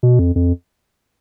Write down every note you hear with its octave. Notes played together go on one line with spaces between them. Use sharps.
B2
F2
F2